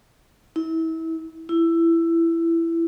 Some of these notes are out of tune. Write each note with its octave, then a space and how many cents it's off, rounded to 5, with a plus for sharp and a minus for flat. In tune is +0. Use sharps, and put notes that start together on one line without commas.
E4 -30
E4 +15